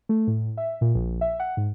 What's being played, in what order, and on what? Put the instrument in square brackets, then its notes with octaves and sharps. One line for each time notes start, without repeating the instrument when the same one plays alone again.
[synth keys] A3
A2
E5
A#2
A#1
E5
F#5
G#2